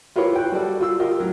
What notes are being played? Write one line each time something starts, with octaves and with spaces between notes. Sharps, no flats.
E4 F4 G4 A#4 B4 C#5
G5 F#6
G3 F#4 A4 D5
F4 E6
F4 G4 A#4 D#5
A2 F#3 A#4